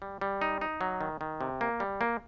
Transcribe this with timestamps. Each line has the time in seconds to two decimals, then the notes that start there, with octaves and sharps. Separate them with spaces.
0.02 G3
0.21 G3
0.42 D#4
0.61 D#4
0.81 F#3
1.01 D#3
1.21 D#3
1.41 C3
1.61 A#3
1.80 G3
2.01 A#3